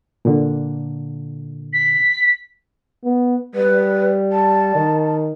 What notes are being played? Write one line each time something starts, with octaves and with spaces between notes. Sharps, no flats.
A#2 D3
B6
B3
G3 B4
A5
D#3